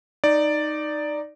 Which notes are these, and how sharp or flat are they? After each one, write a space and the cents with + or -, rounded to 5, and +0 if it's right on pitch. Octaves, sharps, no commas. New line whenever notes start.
D#4 -10 D5 +0